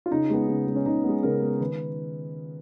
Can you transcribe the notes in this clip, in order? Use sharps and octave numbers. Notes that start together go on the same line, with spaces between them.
F4
C#3 D#4
G#3 B3
C#3
G#3 B3
C#4
C#3 D#4
G#3 B3
C#3 A#4
G#3 B3
D#3 B4